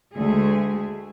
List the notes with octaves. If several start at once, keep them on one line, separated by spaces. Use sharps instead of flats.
D2 G#3 A3 G#4